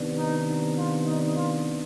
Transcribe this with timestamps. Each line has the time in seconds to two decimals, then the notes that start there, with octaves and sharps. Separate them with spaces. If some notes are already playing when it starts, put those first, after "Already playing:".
Already playing: C3 D#3 B3 D4
0.17 D#4
0.77 F4
1.06 D#4
1.36 F4